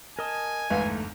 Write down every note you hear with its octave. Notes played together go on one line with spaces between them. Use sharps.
A#4 D#5 G#5 A5
G1 E2 G#2 G#3 A3 B4 F5